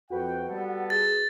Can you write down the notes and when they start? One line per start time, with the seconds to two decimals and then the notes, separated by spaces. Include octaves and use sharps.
0.10 F2 F#4 B4 F#5 G5
0.49 G3 B3 A4
0.90 G#4 A6